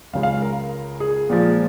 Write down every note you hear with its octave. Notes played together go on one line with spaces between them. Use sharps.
C#2 C#3 G#3 F5
F5
A#4
G#4
A#2 F3 G#3